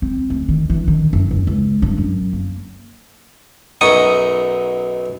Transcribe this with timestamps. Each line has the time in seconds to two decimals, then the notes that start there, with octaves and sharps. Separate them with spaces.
0.02 C4
0.30 D2
0.49 D#3
0.70 E3
0.88 D#3
1.13 F#1
1.31 D#2
1.47 C#2
1.82 G2
1.98 F#2
2.33 A#3
3.81 B1 F#2 D#4 C#6 D#6